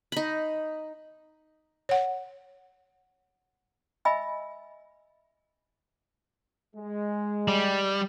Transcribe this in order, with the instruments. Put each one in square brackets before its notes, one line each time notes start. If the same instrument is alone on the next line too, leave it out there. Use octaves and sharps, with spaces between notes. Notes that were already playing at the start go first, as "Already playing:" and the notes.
[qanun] D#4 B5
[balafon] C#5 F#5
[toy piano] D#5 E5 G#5 B5 E6
[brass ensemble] G#3
[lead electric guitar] G3